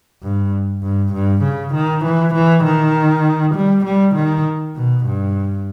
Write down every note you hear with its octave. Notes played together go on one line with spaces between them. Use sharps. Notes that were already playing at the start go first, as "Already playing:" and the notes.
G2
G2
G2
C#3
D#3
E3
E3
D#3
G3
G3
D#3
B2
G2